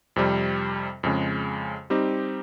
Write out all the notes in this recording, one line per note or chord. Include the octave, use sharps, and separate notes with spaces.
F2 C3 G3
F2 C#3 G#3
G3 C4 D#4 G4